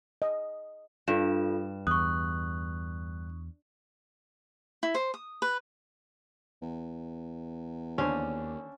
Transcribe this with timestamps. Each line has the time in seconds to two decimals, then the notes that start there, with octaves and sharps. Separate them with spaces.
0.22 D#5
1.08 G2 F4 A4 E7
1.87 E2 C#6 D#6 F#6
4.83 E4
4.95 C5
5.14 D#6
5.42 B4
6.62 E2
7.98 D#2 D3 C#4 D4 C5